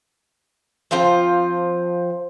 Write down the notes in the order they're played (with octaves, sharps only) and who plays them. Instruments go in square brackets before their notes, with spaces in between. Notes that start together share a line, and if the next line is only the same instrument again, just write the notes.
[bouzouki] F3 C4 F4 C5